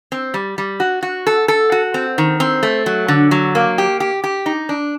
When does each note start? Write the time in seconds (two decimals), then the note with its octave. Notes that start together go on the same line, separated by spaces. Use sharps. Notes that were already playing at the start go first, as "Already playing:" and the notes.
0.12 C4
0.34 G3
0.58 G3
0.80 F#4
1.03 F#4
1.27 A4
1.48 A4
1.72 F#4
1.94 C4
2.18 D#3
2.40 C4
2.63 A3
2.86 F#3
3.08 D3
3.31 F#3
3.55 A#3
3.78 G4
4.00 G4
4.24 G4
4.46 D#4
4.69 D4